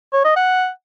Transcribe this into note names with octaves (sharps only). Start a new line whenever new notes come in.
C#5
D#5
F#5